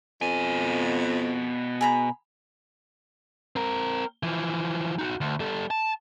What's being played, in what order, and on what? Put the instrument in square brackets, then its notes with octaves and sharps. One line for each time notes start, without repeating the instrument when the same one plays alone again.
[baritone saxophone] F2 [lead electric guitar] B2 G#5
[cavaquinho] G#4 A#5 B5
[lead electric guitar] C4 A#4
E3 F3
D#4 F#4
D2
G3 A4
A5